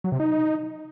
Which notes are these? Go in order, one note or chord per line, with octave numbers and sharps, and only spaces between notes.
F#3
C3
D#4